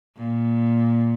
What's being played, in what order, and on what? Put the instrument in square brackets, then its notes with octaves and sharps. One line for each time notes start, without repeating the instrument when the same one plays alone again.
[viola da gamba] A#2